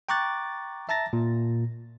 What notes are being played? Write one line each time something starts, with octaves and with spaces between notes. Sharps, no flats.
G5 A#5 C#6 D6 F#6 A6
E5 A5 A#5 A6 A#6
A#2